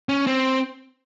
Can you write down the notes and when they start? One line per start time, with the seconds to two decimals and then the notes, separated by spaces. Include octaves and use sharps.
0.09 C#4
0.27 C4